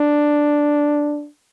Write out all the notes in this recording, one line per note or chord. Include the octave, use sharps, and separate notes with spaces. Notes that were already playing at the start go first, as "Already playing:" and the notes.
Already playing: D4